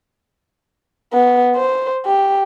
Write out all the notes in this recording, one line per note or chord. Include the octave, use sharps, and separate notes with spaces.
B3
C5
G4